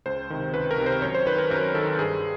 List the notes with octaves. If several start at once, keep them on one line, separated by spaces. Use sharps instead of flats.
C#2 C5
C3 D#3
C#2 B4
A#4
C3 D#3
C5
F#2 C#5
C5
D#3 B4
A#4
F#2 A#4
D#3 A4
G2 G#4